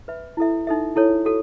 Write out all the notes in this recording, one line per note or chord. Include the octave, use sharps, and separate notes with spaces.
B4 E5 B5
E4 A4 E5
D#4 A4 E5
E4 A4 C#5
F#4 A4